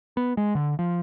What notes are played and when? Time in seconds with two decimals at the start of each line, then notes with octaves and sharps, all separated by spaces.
0.17 B3
0.37 G#3
0.55 D3
0.79 F3